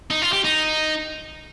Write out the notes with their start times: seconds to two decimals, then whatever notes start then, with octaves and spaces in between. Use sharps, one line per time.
0.10 D#4
0.22 F4
0.33 G4
0.45 D#4